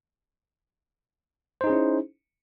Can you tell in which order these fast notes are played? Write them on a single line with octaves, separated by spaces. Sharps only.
C5 D#4 G#4 C#4 E4